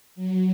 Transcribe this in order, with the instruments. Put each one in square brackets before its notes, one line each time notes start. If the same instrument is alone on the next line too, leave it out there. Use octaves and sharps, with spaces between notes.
[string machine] F#3